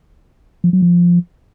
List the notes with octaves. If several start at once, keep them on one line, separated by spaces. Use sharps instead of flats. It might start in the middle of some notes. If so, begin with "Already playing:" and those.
F3
F#3
F3